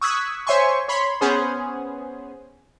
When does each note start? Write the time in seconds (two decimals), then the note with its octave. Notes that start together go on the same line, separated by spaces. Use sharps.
0.01 C#6 D#6 E6 F#6 G#6 B6
0.47 C5 C#5 E5 G#5 C6 C#6
0.88 C#5 B5 C6
1.21 B3 C#4 G#4 C5